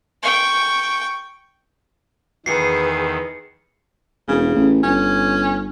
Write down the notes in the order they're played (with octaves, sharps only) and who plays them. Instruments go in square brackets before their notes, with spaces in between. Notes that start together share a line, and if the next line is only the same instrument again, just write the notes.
[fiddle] G5 C#6
[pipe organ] E2 D#3 [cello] G#4 B4 [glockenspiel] C7 C#7
[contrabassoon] E1 [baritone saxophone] C#3
[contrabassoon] A1
[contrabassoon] G1 [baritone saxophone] C#4